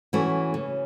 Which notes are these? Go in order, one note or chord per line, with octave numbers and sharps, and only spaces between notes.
E3 A3 C#4 F#4
C#3